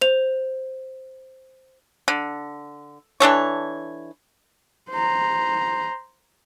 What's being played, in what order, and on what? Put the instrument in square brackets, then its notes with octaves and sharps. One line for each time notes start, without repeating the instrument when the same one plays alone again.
[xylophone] C5 F7
[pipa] D3
E3 D4 A4 C#5
[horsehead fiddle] C5 A#5